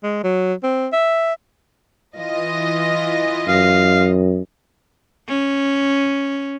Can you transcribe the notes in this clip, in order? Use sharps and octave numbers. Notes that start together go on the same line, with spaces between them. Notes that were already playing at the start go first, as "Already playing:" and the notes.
G#3
F#3
C4
E5
E3 F4 D#5
F#2 F5
C#4